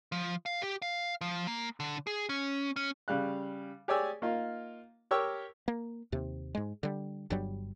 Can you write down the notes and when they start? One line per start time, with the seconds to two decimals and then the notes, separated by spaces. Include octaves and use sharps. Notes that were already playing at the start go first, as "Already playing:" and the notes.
0.12 F3
0.46 F5
0.62 G4
0.82 F5
1.21 F3
1.47 A#3
1.80 D3
2.07 G#4
2.29 C#4
2.76 C#4
3.08 C#3 G3 F5 F#6
3.88 G4 G#4 C#5 D5 G#5 E6
4.22 A#3 D#4 F4
5.11 G4 A#4 C#5 G5 C#6 E6
5.68 A#3
6.12 D#2 C3
6.55 G#2 G#3
6.83 D3 G3
7.30 G1 G2 F#3 G3